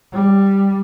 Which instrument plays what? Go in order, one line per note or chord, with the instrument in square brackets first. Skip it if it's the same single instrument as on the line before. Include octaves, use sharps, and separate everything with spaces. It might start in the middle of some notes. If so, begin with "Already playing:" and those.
[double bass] G3